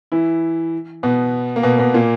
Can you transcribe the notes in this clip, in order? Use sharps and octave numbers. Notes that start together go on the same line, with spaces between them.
E3 E4
B2 B3
A#3
B2 B3
B2 B3
A#2 A#3